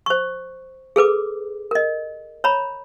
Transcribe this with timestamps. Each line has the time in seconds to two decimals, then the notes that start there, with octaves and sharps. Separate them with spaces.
0.06 C5 C#6
0.96 G#4 A4 B4 D6
1.71 A#4 D#5
2.44 C#5 A#5 B5